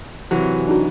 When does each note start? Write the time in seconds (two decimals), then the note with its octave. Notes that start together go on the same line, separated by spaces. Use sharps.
0.31 C3 E3 F#3
0.67 D4 D#4 F#4